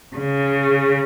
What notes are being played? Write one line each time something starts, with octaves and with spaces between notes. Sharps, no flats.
C#3